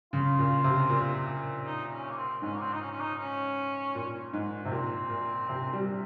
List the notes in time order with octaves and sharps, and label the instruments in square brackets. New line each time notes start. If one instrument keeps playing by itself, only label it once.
[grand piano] C#3 [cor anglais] F4
[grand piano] A#2
C3
A#2
[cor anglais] D#4
C#4
A#3
C4
[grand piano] G#2 [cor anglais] C#4
[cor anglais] A#3
C4
D#4
C#4
C#4
D#4
C#4
[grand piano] A#2
G#2
C3
[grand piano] A#2 [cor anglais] C4
[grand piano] A#2
C3
G3